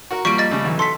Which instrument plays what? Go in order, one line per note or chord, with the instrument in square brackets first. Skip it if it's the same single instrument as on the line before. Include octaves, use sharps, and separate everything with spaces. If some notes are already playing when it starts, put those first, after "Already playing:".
[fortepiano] F#4 A#4
[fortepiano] F3 G3 A#3 [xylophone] C#6 D7
[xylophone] D#5 A6
[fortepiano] C#3 G3 A3
B1 E3
[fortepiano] A4 [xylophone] C6 B6